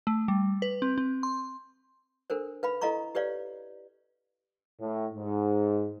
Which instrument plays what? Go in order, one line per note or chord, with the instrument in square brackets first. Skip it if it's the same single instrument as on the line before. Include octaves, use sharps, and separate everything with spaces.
[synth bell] A3
G3
B4
C4
C4
C6
[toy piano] D4 A4 A#4 C5
B4 F5 B5
E4 A4 D#5 F5 A#5 C#6
G4 B4 C#5 D5 F5
[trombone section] A2
G#2